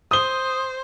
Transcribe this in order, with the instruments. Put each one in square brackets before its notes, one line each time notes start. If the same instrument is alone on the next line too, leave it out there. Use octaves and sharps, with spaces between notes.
[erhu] C5 [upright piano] D#6 G7